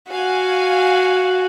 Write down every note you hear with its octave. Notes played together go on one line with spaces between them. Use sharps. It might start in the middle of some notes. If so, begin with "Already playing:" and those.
F#4 F5 G#5